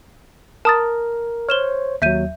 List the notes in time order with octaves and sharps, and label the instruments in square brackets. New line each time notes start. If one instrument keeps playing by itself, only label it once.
[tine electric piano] A#4 [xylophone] A5 D#6 A6
[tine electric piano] C5 C#5 [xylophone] F6 E7 G7
[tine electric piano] D#2 F#3 [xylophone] E5 G6 D#7